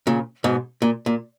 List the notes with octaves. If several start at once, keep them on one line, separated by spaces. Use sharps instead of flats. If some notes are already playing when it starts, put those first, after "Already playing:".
A#2 C#3
G#2 B2
A#2
A#2